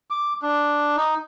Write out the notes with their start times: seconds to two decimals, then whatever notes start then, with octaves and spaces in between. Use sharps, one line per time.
0.10 D6
0.42 D4
0.97 D#4